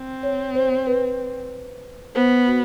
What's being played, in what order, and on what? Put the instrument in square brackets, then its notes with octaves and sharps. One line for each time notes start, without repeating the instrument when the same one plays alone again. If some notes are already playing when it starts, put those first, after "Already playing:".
Already playing: [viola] C4
[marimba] C#5
C5
B4
[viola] B3 [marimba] C5
[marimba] F#4